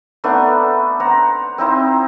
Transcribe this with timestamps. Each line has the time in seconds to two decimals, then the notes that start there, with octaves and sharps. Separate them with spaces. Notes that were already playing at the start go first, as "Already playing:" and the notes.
0.24 A3 B3 D4 D#4
1.00 C5 F#5 A#5
1.58 C4 D#4 E4 C5